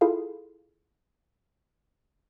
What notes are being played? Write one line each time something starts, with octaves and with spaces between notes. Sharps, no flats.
E4 F4 G#4 A4 F5